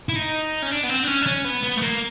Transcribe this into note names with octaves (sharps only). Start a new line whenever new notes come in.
E4
D#4
C#4
D4
B3
C4
D4
C#4
D4
C#4
B3
B3
A3
A#3